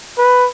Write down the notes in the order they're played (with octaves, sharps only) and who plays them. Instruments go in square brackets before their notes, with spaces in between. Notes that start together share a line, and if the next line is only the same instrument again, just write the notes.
[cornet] B4